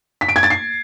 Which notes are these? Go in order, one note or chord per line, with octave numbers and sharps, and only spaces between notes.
B6
D7
G#6
A6
C7